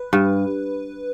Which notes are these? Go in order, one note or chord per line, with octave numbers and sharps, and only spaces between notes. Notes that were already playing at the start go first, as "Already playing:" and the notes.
Already playing: B4
G2